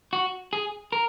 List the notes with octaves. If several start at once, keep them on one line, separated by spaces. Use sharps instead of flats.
F#4
G#4
A#4